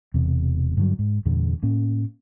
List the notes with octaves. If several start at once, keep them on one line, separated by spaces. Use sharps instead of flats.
E1 E2 C3
G2 D3 D#3 F#3
G#2
E2 G2 A#2 D3
A2 A#3 C#4